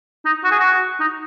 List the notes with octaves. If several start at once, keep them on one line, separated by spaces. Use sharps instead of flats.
D#4
F#4
G#4
F#4
D#4